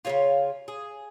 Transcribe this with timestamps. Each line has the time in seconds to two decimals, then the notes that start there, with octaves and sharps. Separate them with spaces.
0.05 C#3 G#3 F4 C#5
0.68 G#4